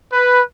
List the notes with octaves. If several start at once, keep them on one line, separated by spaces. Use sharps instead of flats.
B4